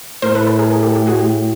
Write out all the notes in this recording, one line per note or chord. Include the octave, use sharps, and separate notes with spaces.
A2 A#4 C5
A4 B4
A4 B4
G#4 A#4
G#4 A#4
G4 A4
G4 A4
F#4 G#4
G4